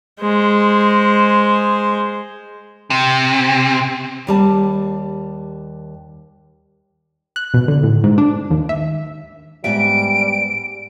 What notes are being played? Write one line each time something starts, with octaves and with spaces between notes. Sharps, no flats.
G#3 C5
C3
D#2 G3 A5
F#6
B2
D3
A2
G#2
D4
D#2
E5
G#2 G3 B3 E5 D7